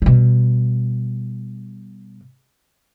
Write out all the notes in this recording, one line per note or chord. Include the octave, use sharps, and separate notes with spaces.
B2 G3